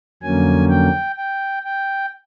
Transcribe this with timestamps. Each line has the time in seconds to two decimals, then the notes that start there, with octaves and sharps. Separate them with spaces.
0.23 F2 D3 F#3 A#3 C#4 G#5
0.69 G5
1.17 G5
1.64 G5